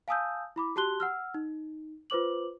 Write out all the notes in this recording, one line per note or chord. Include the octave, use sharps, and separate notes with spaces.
F5 G#5 A5 D#6 E6 G6
E4 B5 D6
F#4 G4 A5 C6 F#6 G7
F#5 E6 F6
D#4
F4 B4 C5 D6 F#7